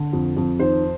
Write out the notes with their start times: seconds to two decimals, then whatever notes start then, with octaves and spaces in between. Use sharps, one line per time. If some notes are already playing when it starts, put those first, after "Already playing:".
Already playing: D3
0.13 F2
0.37 F2
0.59 D#3 C5